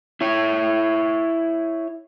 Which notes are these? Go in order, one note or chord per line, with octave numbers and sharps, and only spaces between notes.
E4 C#5